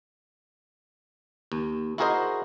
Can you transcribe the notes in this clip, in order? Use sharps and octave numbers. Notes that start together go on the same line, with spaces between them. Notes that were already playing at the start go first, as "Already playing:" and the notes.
D#2
E4 F#4 G#4 A#4 C5 D#5